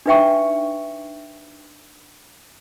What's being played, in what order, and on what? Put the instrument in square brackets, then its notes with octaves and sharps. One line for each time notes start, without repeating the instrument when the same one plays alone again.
[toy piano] D4 D#4 B4 E5 G5 C#6